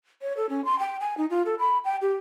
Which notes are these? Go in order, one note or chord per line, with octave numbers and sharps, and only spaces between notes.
C#5
A4
C#4
C6
G5
G#5
D#4
F4
A4
B5
G5
G4